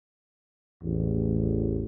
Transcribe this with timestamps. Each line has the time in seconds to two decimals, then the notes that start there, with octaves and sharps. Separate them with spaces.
0.83 A1 E2